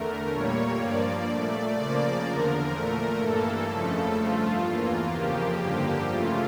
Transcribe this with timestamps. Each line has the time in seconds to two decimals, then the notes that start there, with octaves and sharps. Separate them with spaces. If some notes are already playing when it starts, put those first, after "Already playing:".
Already playing: E2 D3 A3 A#4
0.30 A#2 G3 A#3 C#5
0.78 G2 F3 A#3 D5
1.26 A#2 A3
1.74 C#3 F3 A#3 D5
2.23 E2 D3 F3 A#4
2.71 A#2 A3
3.19 G2 E3 A#3 A4
3.68 F2 C#3 F3 A3
4.16 G2 F3 A3 F4
4.64 E2 E3 A#3
5.12 F2 C#3 F3 A#3 G4
5.60 G2 D3 F3 A#3
6.09 C#3 E3 A3 F4